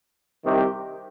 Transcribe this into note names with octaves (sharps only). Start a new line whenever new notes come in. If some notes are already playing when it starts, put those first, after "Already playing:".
C2 C3 D#3 G4